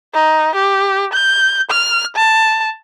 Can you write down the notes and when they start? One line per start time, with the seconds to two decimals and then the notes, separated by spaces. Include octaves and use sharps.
0.14 D#4
0.55 G4
1.13 G6
1.70 F6
2.16 A5